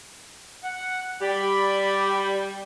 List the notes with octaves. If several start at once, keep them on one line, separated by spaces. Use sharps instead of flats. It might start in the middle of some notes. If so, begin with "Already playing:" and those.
F#5
G3 G4 D5 G5 B5